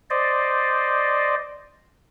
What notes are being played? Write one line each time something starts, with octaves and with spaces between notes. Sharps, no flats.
C5 D5 D#5